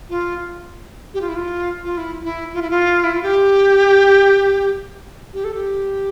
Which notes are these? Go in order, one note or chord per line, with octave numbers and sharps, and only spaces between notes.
F4
G4
F4
E4
F4
F4
E4
E4
F4
E4
F4
E4
F4
G4
G4
A4
G4